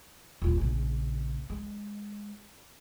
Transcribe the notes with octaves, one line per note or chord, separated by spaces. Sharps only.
D#1 F4
A#1 C#3
G#3